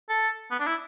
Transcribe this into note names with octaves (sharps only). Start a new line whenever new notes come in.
A4
B3
D4
E4